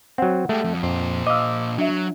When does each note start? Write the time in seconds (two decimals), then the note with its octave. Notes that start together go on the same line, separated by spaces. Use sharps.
0.18 F#3 C4 F#5
0.49 G#3 A3 G4
0.64 F2
0.83 F2 A#2 C5
1.27 D#5 F5 D6 E6
1.78 F#3 D4 E5